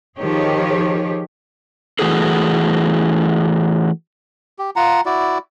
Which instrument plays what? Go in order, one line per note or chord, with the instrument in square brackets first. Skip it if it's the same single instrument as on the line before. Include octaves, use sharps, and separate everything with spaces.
[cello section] D#3 F3 G4 G#4 C#5
[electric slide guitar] E3 A3 E4 F#4 G#4 A4
[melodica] G4
F4 F#5 A#5
E4 F#4 D5